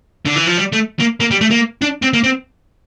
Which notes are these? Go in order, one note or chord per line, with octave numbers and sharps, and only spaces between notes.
D3
E3
F3
G3
A3
A#3
A#3
G3
A3
A#3
D4
C4
A#3
C4